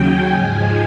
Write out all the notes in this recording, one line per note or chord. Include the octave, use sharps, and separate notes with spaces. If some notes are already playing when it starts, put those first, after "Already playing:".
Already playing: D#2 C#3 F#3 G5 G#5
G#2 F3 G#3